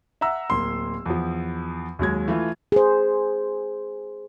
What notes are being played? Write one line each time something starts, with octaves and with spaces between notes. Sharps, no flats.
E5 F#5 A#5 E6
D1 A#3 C6
E2 F3
D#2 F#3 G#3 G#6
E3 A3 F4
G#4 C5